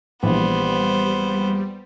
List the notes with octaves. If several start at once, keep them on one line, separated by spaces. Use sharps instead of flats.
A#1 E3 G3 B3 C5